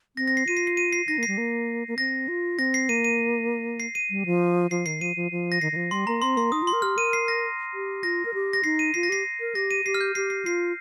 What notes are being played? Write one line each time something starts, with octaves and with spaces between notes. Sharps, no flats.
C4 A#6
A#6
C7
F4 D#7
C7
C7
D#7
C7
D#4 A#6
A#3
G3 C7
A#3
A#3
C4 A#6
F4
C4 A#6
C7
A#3 D#7
D#7
C7
D#7
G3
F3
F3 C7
D#3 C7
F3 D#7
F3
F3
A#6
D#3 C7
D#3
F3
G3 C6
A#3 A#5
C4 C6
A#3 C6
D#4 D#6
F4
C6
A#4
G4 F6
A#4 D#7
C7
A#6
G4
F4 A#6
A#4
G4
A#6
D#4 C7
D#7
F4 C7
A#6
G4 C7
A#4
G4 A#6
D#7
G4 C7
F6
G6
G4 C7
C7
F4 C7